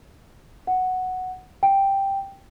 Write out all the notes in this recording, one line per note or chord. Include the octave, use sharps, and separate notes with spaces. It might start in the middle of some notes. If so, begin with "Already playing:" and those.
F#5
G5